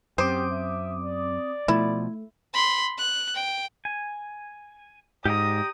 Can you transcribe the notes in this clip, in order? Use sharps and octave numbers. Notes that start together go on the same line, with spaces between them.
F#2 C4 G4 C5 D6 D#6
E5
D5
B2 F3 A3 E4
B5 C6
F#6
G5
G#5
G#2 G4 D5 A#5 D#6